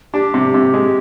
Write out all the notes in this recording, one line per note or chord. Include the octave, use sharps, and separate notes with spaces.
D4 G4
C3
C3
G#3